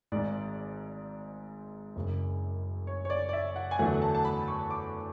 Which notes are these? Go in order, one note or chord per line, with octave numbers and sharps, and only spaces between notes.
G#1 G#2 G#3 D5
F#1 F#2 C#3
C#5
C#5
D5
D5
E5
F#5
G#5
E2 D3 F#3 A3 F#5
A5
A5
B5
C#6
D6